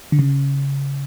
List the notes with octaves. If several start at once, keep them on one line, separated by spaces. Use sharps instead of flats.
D3
C#3